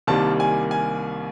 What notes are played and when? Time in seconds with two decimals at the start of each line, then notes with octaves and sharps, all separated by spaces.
0.07 C2 C3 D#3 G3 A#3 A5
0.40 G#5
0.71 G#5